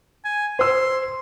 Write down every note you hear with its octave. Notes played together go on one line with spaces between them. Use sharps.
G#5
C5 C6 E6